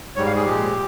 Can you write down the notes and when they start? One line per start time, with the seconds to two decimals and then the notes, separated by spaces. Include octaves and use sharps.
0.16 G#2 G3 C#5
0.26 F5
0.36 G#4
0.46 A#2 F3 G#3 G4